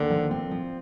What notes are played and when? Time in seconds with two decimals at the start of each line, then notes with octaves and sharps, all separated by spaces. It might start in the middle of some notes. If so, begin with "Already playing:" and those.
Already playing: D#2 D3
0.10 F3
0.31 C4
0.51 F3